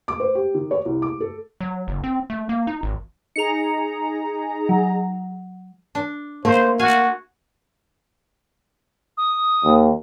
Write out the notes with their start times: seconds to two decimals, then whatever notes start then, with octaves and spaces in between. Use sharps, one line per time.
0.08 D6
0.20 C5
0.35 G4
0.55 D#3
0.71 C#5
0.86 C2
1.02 D6
1.20 A4
1.61 F#3
1.88 F#1
2.04 C4
2.30 A3
2.49 A#3
2.67 D#4
2.83 G#1
3.36 D#4 G#4 A#5 C#7 F7
4.69 F#3
5.95 D4
6.45 A3 A#3 C5
6.79 F#4 F5 G#5
9.17 D#6
9.64 D#2